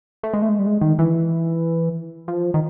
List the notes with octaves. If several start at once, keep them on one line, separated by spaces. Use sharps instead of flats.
A3
G#3
A3
G#3
G3
G#3
D#3
E3
F3
D#3